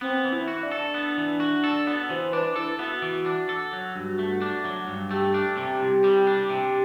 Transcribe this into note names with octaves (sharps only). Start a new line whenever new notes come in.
B3 C4
E3
E4
F#4
D4
A4
B3
E3
F#4
A4
B3 F#4
E3 C5
D4 B4
E4 A4
B3 F#4
E3
D4
A4
F#3
G2
A3
D4
F#3
G2
A3 G4
D4
C3 G4
C2
G3
D4
C3